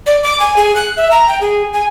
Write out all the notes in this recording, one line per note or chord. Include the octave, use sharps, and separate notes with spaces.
D5
D6
G#5
G#4
F#6
E5
A#5
G5
G#4
G#5